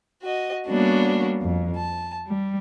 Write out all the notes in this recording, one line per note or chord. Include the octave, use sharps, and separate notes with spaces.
F#4 D#5
G3 A#3 B3 C#4 D4 F#4
F2
A5
G3